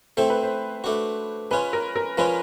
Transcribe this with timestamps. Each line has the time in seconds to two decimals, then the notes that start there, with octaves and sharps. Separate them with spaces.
0.17 A3 C4 E4 A4 C5
0.30 B4
0.43 C5
0.84 A3 D4 F#4
1.51 G#3 C#4 F4 B4
1.73 A#4
1.96 A#4
2.18 F3 G#3 C#4 F4 B4